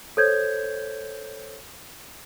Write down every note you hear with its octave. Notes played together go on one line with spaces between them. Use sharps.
A4 C5 C#5 G6 G#6